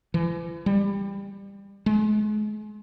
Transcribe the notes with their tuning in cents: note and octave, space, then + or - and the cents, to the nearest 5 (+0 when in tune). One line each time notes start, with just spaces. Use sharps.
E3 +40
G3 +20
G#3 +35